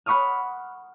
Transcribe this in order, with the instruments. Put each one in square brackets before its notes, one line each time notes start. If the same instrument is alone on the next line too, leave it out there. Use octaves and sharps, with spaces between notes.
[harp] F#5 B5 C#6 D#6 F6